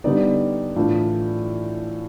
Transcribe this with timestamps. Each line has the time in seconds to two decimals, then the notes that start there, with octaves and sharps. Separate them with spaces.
0.04 D3 G3 B3 D#4 D5
0.76 A2 E3 A3 D4 F4